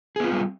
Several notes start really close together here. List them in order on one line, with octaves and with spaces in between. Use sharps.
G#4 B3 F4 C4 G3